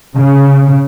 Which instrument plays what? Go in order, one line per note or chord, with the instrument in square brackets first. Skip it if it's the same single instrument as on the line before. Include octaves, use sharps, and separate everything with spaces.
[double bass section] C#3